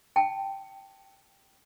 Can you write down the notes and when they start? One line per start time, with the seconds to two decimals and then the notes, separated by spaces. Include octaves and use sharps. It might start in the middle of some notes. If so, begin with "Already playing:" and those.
0.16 G5 A5